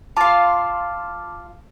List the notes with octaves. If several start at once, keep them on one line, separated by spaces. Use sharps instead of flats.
F4 F5 A5 D6